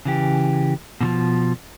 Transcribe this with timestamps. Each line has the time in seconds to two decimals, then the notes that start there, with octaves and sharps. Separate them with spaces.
0.05 C#3 E3 G4
1.01 B2 E3 F3